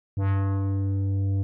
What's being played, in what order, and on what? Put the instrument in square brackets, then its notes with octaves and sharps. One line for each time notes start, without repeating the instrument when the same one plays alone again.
[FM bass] G2